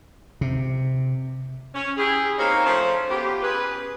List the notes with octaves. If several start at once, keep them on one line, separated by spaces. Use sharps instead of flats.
C3
C#4
E4 G4 G#4
A#3 C4 D#4 C#5 F5
F3 A3 C#4 C5
B3 F4 G4
C#4 G#4 B4